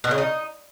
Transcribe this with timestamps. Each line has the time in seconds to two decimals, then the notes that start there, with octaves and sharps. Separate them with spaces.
0.04 B2
0.11 C#3
0.18 D#4